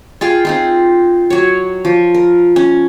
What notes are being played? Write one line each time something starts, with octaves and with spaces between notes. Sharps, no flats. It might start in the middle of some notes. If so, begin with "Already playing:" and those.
F4 G#4 F5 G5
C4 D#4 F4
F#3 C#5
F3
A#4
C#4